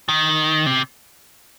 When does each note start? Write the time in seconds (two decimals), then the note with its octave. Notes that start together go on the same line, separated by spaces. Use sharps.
0.09 D#3
0.66 C3